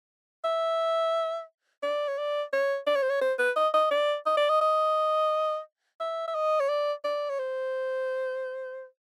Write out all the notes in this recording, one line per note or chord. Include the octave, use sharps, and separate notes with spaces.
E5
D5
C#5
D5
C#5
D5
C#5
C5
C#5
C5
B4
D#5
D#5
D5
D#5
D5
D#5
D#5
E5
E5
D#5
C#5
D5
D5
C#5
C5